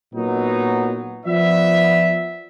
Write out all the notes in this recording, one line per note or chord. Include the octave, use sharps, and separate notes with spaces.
A#2 F#3 B3 D#4
F3 B3 D5 E5